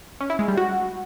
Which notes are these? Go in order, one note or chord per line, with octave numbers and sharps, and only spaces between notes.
C#4
E4
G#3
G3
F#4